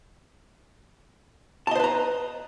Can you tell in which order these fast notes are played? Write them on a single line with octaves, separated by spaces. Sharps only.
A5 D#5 C5 B4 A#5